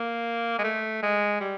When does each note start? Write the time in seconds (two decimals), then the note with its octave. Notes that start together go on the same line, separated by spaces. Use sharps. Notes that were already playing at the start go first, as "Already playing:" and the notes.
Already playing: A#3
0.59 G#3
0.64 A3
1.03 G#3
1.41 G3